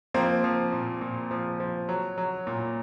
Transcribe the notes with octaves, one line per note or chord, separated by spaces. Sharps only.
F3 A#3 C4
F3
A#2
A#2
F3
F3
F#3
F#3
A#2